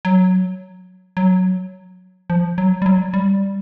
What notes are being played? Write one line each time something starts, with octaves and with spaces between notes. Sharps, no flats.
F#3
F#3
F3
F#3
G3
F#3
G3